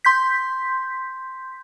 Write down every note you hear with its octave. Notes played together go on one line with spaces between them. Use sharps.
C6 G6 B6